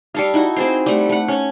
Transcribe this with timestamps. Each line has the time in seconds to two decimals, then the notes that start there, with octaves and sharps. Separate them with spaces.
0.15 G3 A4 F5
0.34 D#4 E4 F#4
0.56 C4 G#4 C5
0.86 G3 A3 F#5
1.09 A3 F#5
1.28 C#4 C#6